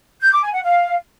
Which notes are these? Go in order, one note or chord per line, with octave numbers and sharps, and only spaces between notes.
G6
D6
G#5
F#5
F5